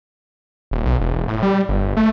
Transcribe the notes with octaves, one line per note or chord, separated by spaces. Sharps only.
D#1
B1
E1
A2
G3
G1
A3